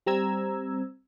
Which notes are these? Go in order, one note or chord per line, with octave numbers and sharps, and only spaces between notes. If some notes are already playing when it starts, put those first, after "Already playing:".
G3 C4 A#5 E6 G#6